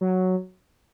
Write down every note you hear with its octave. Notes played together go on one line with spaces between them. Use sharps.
F#3